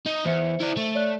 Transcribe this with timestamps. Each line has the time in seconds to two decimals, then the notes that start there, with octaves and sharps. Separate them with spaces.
0.06 D#4
0.25 E2 C5 E5 C#7
0.61 E4 D5
0.77 A3
0.94 C#5 D5 F#6